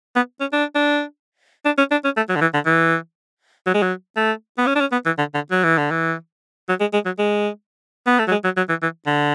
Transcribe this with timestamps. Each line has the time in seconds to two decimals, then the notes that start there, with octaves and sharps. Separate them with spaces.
0.16 B3
0.40 C#4
0.53 D4
0.75 D4
1.65 D4
1.78 C#4
1.91 D4
2.04 C#4
2.17 A3
2.29 F#3
2.36 D3
2.41 E3
2.54 D3
2.66 E3
3.66 F#3
3.74 G#3
3.82 F#3
4.17 A3
4.58 B3
4.67 C#4
4.76 D4
4.80 C#4
4.92 B3
5.06 E3
5.18 D3
5.35 D3
5.51 F#3
5.64 E3
5.78 D3
5.91 E3
6.69 F#3
6.80 G#3
6.93 G#3
7.05 F#3
7.18 G#3
8.07 B3
8.19 A3
8.28 F#3
8.31 G#3
8.45 F#3
8.57 F#3
8.69 E3
8.83 E3
9.07 D3